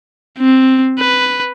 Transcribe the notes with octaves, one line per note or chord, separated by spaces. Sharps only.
C4
B4